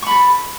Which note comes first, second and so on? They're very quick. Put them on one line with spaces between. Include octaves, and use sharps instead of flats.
C#6 B5 A4